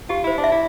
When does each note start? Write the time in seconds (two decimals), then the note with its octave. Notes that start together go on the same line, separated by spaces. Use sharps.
0.09 F4 G4
0.24 E4 C5
0.38 D4
0.44 E5
0.52 E4